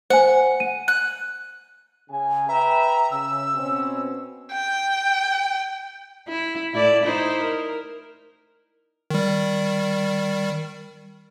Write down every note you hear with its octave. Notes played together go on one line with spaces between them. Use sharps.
C5 F#5 G#5
D#7
F#6
C#3 G#5
B4 E5 G5 A#5
C#3 E6
B2 C4 C#4
G5
E4
A2 E4 D5
D#4 E4 C5
A#4
D#3 G3